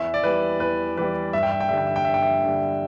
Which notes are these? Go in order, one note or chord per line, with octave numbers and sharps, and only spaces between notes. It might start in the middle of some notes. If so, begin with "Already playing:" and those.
Already playing: E2 E5
D5
E3 G3 B4
E2 B4
E3 G3 B4
G2 E5
G5
E5
G5
D3 G3 E5
G5
E5
G5
G2 E5
G5
E5
D3 G3